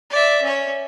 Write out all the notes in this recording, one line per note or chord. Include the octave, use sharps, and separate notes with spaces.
D5 E5
C#4 C#5